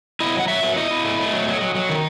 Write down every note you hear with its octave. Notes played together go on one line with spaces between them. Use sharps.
E4 D#5
F#3 F#5
F#3 E5
F#3
E4 D#5
E4
A3
A3
F#3
F#3
F#3
F#3
D#3